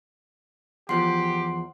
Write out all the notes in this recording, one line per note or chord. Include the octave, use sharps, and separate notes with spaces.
E2 F3 G4 F#5 C6 C7